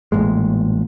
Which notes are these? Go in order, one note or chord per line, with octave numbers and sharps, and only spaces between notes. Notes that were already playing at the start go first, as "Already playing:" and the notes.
A1 A#2 G#3